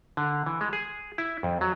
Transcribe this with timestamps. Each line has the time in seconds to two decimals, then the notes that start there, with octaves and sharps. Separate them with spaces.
0.17 D3
0.46 E3
0.61 G#3
0.73 G#4
1.18 E4
1.43 F2
1.61 F#3